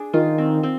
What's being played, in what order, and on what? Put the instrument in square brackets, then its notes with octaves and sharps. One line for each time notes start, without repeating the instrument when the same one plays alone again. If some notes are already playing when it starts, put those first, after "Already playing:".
Already playing: [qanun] D4 G#4
[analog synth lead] D#3 [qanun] F4
[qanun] C4
C4